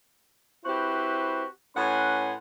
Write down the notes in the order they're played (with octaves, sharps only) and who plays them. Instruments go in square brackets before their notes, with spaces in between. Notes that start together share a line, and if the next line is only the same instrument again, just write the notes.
[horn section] C4 E4 F#4 G4 B4 C5
A2 C#4 B4 F#5 G#5 C6